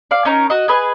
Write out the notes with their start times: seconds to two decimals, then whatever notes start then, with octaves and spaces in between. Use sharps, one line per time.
0.11 D5 F5
0.25 C#4 D#4 A#4
0.50 F#4 D#5
0.68 G#4 B4 D#5